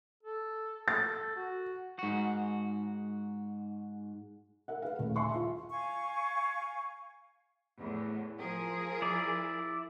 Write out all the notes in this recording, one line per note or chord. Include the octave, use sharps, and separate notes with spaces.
A4
A4 A6
F#4
G#2 F#4
A#4 E5 F#5
B4 F5
D#1 A3
E5 G#5 A5 C6 C#6
F4 E5
F5 G#5 C#6
E2 A2
F3 G#4 A#4
E4 D5